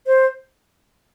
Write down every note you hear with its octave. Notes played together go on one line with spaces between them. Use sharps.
C5